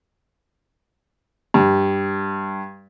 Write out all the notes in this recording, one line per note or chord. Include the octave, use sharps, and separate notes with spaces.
G2